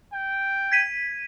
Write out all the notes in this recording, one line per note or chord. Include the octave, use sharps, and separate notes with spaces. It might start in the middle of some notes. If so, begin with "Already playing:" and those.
G5
G#6 B6 D#7